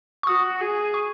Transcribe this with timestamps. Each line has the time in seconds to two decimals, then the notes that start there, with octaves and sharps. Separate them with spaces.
0.23 C#6
0.27 F#4 D#6
0.61 G#4
0.94 C#6